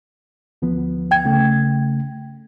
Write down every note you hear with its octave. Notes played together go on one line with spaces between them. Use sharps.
D2 F3 B3
G5 G#6
C#3 A3